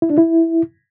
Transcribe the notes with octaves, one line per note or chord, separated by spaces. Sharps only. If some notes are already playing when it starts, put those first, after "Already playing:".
E4
D4
E4